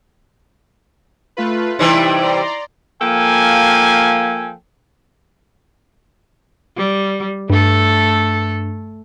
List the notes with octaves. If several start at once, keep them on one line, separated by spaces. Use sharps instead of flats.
A3 F4 B4
C3 E3 G3 D#4 E4
D5 A#5 C6
F3 A#3 A4 G5 G#5
G3
G2 A3 A4